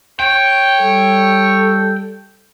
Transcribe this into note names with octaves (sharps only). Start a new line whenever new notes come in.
C#5 G5
G3 A4